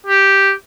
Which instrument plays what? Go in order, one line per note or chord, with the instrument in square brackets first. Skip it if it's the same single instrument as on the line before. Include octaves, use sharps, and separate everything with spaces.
[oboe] G4